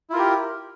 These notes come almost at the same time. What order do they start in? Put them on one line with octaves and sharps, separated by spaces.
E4 F4 A#4 G4